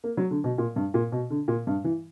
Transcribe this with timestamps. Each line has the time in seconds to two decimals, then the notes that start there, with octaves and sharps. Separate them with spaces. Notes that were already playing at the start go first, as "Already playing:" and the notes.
0.04 A#3
0.17 F#3
0.31 D3
0.44 B2
0.58 A#2
0.76 G2
0.94 A#2
1.12 B2
1.30 D3
1.48 A#2
1.67 G2
1.84 E3